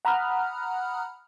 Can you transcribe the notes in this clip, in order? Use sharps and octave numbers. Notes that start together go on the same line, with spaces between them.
F#5 A#5 B5 D#6 F6 F#6